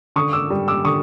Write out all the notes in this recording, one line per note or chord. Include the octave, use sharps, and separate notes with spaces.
D3 C#6 D#6
D6 E6
G3
D6 E6
D3 C#6 D#6